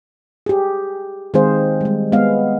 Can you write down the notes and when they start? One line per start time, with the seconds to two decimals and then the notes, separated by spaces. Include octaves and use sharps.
0.46 G4 G#4
1.34 D#3 G#3 C4 G#4 C5 F5
1.81 G3 G#3
2.12 G#3 B3 F5